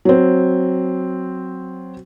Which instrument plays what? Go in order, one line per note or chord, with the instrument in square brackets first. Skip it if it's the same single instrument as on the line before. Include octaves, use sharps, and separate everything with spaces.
[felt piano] F#3 C4